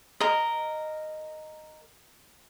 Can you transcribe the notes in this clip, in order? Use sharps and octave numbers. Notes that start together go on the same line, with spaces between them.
A#4 D#5